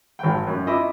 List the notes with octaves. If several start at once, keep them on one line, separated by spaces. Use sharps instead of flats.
G#1 G5
F#2
E4 F4 D#5 E5 B5 D6